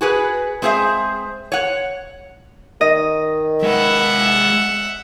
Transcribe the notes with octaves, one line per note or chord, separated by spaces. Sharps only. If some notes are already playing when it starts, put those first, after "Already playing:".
F#4 G#4 B4
G#3 C4 G#4 C5 E5
C#5 F#5
D#3 D#5
G#3 B4 E5 F#5